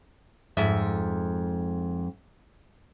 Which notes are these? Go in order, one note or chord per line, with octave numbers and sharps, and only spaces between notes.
F2 G#2 E5